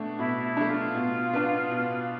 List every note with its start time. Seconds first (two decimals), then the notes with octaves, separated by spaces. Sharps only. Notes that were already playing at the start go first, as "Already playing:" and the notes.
Already playing: B2 A3 D4
0.18 B2 E4
0.44 E4
0.57 A3 D4
0.69 F4
0.95 B2
1.33 B3 D4
1.71 B2